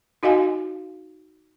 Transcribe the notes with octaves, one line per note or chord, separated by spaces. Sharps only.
D#4 F#4 D#5 F5 G#5